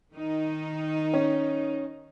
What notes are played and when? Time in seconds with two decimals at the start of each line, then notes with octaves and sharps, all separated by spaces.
0.13 D#3 D#4
1.14 C#4